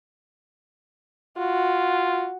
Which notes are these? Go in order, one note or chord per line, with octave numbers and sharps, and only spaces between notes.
F4 F#4